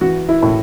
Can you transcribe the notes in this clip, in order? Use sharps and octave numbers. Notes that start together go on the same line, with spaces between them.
E3 F#4
E4
A2